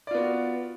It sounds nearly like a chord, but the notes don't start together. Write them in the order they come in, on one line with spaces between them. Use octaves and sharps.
D5 F4 B3 F#4